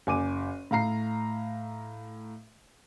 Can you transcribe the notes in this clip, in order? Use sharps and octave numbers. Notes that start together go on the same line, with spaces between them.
F#1 G#5 D6 D#7
A2 F5 A#5 C7